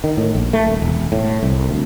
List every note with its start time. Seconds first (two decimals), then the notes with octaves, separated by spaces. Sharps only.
0.04 D#3
0.17 A2
0.35 A#1
0.53 A3
0.66 D#1
0.82 E1
1.12 A2
1.43 C2
1.70 D2